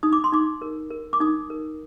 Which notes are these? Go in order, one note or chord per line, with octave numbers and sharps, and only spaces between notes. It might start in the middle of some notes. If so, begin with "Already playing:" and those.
D#4 D#6
D6
C6
D#4 D6
A#4
A#4
D6
D#4 D#6
A#4